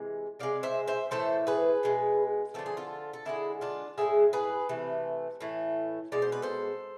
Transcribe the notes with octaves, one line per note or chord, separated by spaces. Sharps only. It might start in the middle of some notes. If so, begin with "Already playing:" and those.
Already playing: C3 E3 G#3
C3 G#3 D5 F5
C5 E5
C5 E5
A2 E3 A3 A4 C5
G#4 B4
B2 G#3
D3 F3 A3 A4
G#4
F4 A4
A4
D3 F3 G#3 E4 G#4
D4 F4
A2 F3 G#3 E4 G#4
G#4 B4
C3 E3 A3
A2 E3 A3
B2 G#3 D5
C5
B4
A4 C5